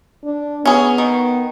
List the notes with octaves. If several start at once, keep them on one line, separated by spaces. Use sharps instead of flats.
D4
B3 C#4 G#4
D#3